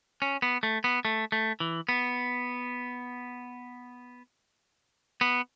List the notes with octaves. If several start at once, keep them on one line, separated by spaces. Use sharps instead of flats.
C#4
B3
A3
B3
A3
A3
E3
B3
B3